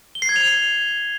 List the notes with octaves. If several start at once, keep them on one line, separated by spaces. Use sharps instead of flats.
G7
C7
G#6
F7